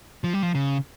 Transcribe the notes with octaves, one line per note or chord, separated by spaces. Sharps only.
F3
G3
F3
C#3